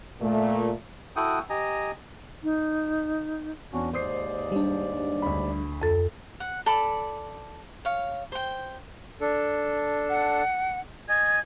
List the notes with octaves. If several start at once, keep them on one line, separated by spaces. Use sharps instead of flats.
A#2 A3
E4 F#4 A4 F#5 G5 D#6
G4 D#5 G#5 A#5
D#4
E2 C#4 D4 F#4
D#2 G#2 C5 D5 D#6 C7
G3 D4
D2 B5
F2 A4
F#5
A4 D5 B5
C#5 F5
C5 G5
D4 A4
F#5
D#5 G#5 G#6